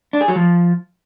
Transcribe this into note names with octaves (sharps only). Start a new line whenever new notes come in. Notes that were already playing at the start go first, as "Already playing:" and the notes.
D4
G#4
F#3
F3